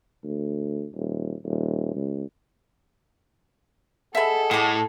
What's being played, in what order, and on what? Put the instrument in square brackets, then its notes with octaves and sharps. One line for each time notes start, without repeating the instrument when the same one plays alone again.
[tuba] D2
D#1
D#1
C#2
[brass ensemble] G#4 D#5 F#5 [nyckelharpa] A4 [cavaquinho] E5 B5
[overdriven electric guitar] A2 [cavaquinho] D6 D#6